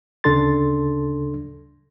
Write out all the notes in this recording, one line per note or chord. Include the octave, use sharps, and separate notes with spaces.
D2 C#3 D4 A4 C6 A6